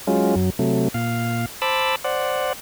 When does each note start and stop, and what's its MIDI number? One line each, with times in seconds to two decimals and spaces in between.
0.07 0.35 54
0.07 0.35 56
0.07 0.35 61
0.07 0.35 65
0.36 0.50 42
0.36 0.50 54
0.59 0.88 48
0.59 0.88 54
0.59 0.88 57
0.94 1.46 46
0.94 1.46 77
1.62 1.96 72
1.62 1.96 81
1.62 1.96 83
1.62 1.96 86
1.62 1.96 88
2.04 2.53 72
2.04 2.53 74
2.04 2.53 78